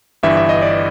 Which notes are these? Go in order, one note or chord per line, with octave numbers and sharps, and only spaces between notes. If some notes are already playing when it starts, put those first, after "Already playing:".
G1 G2 E3 E5
E5
D#5
D5